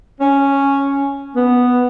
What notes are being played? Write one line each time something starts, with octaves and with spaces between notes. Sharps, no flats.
C#4
B3